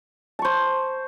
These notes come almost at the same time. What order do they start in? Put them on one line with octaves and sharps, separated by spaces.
A5 C#6 C5